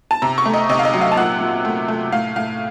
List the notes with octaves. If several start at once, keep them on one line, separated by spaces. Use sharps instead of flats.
A5
C3 A#5
C#6
A3
D#5
C3 D#5
F5
D#5
F#3
F5
A5
A#2 F#5
A#2
A3
A3
A2 F5
A2 F5